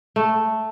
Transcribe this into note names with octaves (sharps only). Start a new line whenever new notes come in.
A3